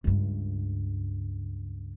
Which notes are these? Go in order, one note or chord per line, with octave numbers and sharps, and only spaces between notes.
C#2 G2